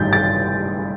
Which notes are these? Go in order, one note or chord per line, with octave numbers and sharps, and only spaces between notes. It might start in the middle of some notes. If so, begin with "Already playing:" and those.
Already playing: A1 G2 D#3 G6 A6
A6